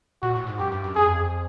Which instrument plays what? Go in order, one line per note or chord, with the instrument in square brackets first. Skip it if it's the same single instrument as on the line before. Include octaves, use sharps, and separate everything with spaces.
[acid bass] A#2 [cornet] F#4
[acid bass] A2
G#2
[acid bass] F#2 [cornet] G4
[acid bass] G2
F#2
[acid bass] F2 [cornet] G#4